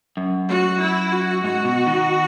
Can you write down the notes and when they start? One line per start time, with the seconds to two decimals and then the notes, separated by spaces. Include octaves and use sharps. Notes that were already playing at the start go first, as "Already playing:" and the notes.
0.17 F#2
0.48 F#4
0.80 E4
1.12 F#4
1.44 G#2 F#4
1.65 B2
1.86 D#3